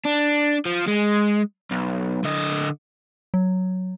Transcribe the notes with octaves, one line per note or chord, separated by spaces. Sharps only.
D4
F3
G#3
B1
D3 D#5
F#3